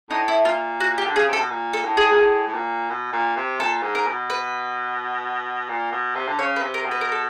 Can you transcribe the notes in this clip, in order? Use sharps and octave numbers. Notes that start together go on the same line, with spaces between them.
A2 D#4
E4
A#2 F4
F#4
G4
D3
C#3 G#4
C3
A4
B2
A#2
A4
A2
G#4
A#2
A2
A2
A#2
B2
A#2
C3
A#2 A4
G#2
A#4
B2
B4
A#2
B2
C3
D3
C#3 C#5
B4
C3
A#4
B2
B4
A#4
A4